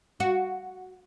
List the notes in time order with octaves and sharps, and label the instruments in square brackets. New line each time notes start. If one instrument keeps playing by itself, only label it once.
[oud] F#4